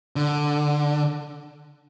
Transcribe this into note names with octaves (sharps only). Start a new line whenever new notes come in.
D3